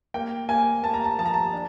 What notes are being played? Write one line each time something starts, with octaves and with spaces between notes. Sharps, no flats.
A#3 G5
A#3 G#5
A#3 A5
A#5
A5
F3 A5
A#5
A5
D4